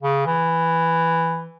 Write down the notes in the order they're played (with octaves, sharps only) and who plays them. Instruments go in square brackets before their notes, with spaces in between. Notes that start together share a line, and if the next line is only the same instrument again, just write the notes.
[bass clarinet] C#3
E3